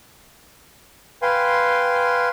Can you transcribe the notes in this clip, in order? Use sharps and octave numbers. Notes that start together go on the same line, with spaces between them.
B4 F5 G5 G#5 C6